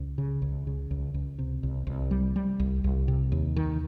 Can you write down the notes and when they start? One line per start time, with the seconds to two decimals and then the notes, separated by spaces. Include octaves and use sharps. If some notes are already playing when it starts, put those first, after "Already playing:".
Already playing: C#2
0.18 C#3
0.42 C#2
0.67 C#3
0.91 C#2
1.14 C#2
1.39 C3
1.63 C2
1.87 C2
2.11 G3
2.36 G3
2.60 C2
2.84 C2
3.08 C3
3.32 D#2
3.57 D#3